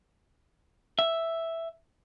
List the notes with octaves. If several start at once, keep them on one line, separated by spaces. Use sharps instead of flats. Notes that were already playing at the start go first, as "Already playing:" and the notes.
E5